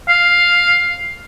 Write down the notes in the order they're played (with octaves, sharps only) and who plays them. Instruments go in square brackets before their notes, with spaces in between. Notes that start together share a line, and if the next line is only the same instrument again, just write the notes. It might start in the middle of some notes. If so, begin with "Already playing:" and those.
[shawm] F5